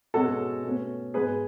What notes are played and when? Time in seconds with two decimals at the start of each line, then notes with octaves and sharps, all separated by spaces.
0.14 B2 G#3 C#4 F#4 A4
0.64 B2 A3 C#4
1.14 G#2 G#3 B3 G#4 B4